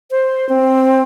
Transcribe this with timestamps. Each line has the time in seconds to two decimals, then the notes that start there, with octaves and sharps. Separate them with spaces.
0.11 C5
0.49 C4